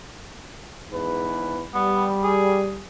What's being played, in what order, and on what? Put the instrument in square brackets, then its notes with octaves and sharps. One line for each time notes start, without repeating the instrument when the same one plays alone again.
[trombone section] E2 G#2 B4
[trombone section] G3 [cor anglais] B3
[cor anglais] G#4